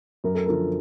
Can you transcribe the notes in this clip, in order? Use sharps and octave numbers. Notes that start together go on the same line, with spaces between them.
F#2 A#4
A4
D3 F3 A#4